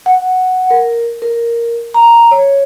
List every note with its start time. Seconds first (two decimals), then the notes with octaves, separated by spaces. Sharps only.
0.06 F#5
0.70 A#4
1.22 A#4
1.94 A#5
2.31 C#5